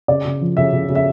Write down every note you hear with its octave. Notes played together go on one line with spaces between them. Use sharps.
C#3 D5
C#3
F3
C#3 E5
C#3
C#3
E5